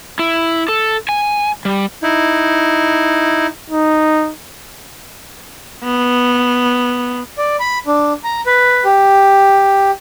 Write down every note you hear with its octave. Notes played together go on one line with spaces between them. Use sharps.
E4
A4
G#5
G3
D#4 E4
D#4
B3
D5
B5
D4
A#5
B4
G4